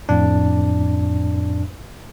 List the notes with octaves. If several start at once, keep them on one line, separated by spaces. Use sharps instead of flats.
F2 A2 D4